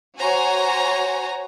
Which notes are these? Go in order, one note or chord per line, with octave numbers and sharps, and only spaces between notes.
F#4 C5 C#5 G#5 A#5